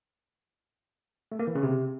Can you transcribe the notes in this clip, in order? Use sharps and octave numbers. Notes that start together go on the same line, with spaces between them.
A3
A#3
E3
C#3
C3